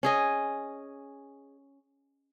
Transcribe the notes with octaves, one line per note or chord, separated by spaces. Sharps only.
C#4 G#4 D#5